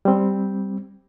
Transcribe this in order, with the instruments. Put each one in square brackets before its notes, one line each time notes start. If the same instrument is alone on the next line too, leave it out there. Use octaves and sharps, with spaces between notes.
[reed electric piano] G3 C4